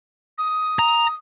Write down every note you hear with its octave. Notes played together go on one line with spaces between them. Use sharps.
D#6
A#5